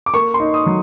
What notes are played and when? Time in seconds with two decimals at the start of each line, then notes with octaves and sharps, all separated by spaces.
0.06 D6
0.14 A#3 C#6
0.34 C6
0.40 D#4
0.54 D#6
0.66 F#3